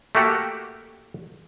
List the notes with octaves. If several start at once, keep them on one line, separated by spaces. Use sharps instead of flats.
A3 A#3 F#4 G4